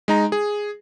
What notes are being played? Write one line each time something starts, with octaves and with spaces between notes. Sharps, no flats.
G#3 D#4 A#5
G#4